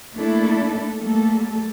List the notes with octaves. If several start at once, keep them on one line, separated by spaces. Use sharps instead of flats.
A3 A#3 D4 E4 A4
G3 A3 A#3 A4